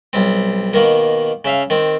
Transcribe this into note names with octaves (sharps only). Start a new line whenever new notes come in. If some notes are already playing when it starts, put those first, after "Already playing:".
B1 G3 C4
B2 D#3 A#3
C#3 E5 F5
D#3 C4